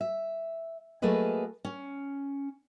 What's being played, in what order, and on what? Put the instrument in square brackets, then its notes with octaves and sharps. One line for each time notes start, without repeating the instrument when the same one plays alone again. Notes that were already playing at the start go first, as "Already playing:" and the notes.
[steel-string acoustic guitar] E5
F#3 A3 A#3 G#4 B4 D#5
C#4